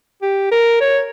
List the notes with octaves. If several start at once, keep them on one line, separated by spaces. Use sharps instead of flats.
G4
A#4
C#5